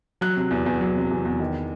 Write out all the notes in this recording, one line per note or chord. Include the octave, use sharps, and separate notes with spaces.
F#3 F#6
C3
E2
E2
F#3
C3
E2
E2
D#3